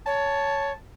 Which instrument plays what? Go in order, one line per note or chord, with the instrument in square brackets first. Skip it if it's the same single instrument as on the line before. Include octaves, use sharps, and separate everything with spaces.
[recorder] C#5 [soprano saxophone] A5